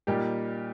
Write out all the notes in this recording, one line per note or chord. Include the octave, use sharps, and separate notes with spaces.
A#2 G3 A#3 D#4 G4